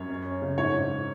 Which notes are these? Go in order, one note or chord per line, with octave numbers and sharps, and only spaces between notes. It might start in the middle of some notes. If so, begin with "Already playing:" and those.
Already playing: F#2 C#5
C#4
C#4
C#3
G#2 C#5
G#2